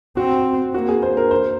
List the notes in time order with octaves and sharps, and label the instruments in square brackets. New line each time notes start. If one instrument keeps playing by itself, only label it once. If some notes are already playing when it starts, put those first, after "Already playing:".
[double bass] C4 [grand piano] F#4
[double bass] A#3 [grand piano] F#4
[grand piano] G#4
C5
A#4
C5